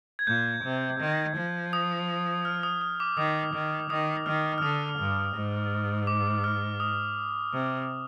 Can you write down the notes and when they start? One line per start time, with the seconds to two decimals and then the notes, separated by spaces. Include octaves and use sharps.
0.19 G#6
0.27 A#2 G6
0.64 C3
1.00 D#3
1.36 F3
1.73 D#6
2.45 F6
2.63 D#6
2.81 D#6
3.00 D6
3.17 D#3 D#6
3.54 D#3
3.90 D#3 D#6
4.26 D#3 F6
4.58 F6
4.62 D3 D#6
4.99 G2
5.36 G#2
6.07 D6
6.44 F6
6.80 D#6
7.53 C3